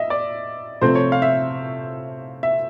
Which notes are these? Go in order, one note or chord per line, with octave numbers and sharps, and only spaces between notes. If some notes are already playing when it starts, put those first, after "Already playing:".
Already playing: D#5 E5
D5
C3 F3 A3 C4 C5
C#5
F5
E5
E5